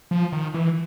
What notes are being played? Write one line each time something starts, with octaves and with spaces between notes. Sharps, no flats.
F3
D#3
E3